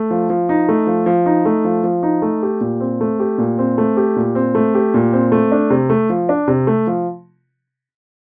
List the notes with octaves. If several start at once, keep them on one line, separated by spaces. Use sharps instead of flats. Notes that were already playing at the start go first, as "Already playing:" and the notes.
Already playing: A3
F3
F3
D#4
A3
F3
F3
D#4
A3
F3
F3
D#4
A3
G4
A#2
C4
A3
G4
A#2
C4
A3
G4
A#2
C4
A3
G4
A#2
C4
A3
D4
C3
A3
F3
D4
C3
A3
F3